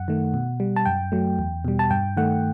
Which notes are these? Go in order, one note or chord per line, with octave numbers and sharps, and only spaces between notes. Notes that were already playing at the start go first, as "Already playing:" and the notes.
Already playing: F#2 F#5
D#3 A3
B2
G3
A5
F#2 G5
F#3 A3
E2
B2 G3
A5
G2 G5
D#3 A3 F#5